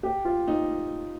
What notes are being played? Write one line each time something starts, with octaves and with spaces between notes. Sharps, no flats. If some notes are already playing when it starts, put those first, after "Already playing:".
G4
F4
D#4